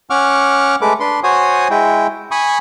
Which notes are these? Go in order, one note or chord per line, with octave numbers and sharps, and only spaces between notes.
C#4 F#5 C#6 D6 F6
G#3 A3 B4 D6
D4 B4 C6
F#4 C5 C#5 G#5 D#6
G#3 E4 G5
G#5 B5 C#6 D#6